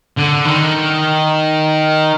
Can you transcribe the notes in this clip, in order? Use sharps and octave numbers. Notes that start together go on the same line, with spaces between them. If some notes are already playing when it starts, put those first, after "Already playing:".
D3
D#3